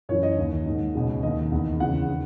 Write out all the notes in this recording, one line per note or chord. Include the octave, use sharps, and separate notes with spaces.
F#2 E3 C#5
D#5
D#2 D#3
G#2 D#3
C#2 B2
D#2 D#3 D#5
E2 D#3
E2 C#3 E3 F#5
D#3